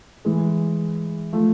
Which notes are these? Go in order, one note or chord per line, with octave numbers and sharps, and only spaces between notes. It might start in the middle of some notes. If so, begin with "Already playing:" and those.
E3 G#3
F3 A3